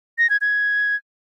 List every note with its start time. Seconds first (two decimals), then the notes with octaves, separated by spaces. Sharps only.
0.18 A#6
0.30 G#6
0.41 G#6